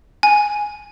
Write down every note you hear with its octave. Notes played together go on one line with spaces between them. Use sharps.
G#5